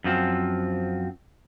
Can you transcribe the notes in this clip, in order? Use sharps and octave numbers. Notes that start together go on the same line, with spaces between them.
F#2 F3 C4